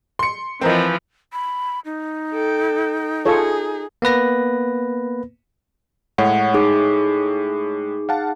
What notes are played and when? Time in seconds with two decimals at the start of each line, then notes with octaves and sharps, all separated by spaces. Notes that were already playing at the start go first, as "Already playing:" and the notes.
0.19 C6 C#7
0.61 E3 F3 C4 A#4 D#5
1.33 B5
1.85 D#4
2.33 A4 G5
3.25 F4 G#4 A4 C#5
4.02 A#3 B3 B4 A#6
6.18 A2 G#3 C#5 F#5
6.54 D#4 G#4 D6
8.09 F5 F#5 A5